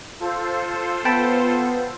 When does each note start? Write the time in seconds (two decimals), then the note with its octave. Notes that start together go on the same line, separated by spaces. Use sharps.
0.20 F4 A4 C5
1.05 B3 G5 A5 B5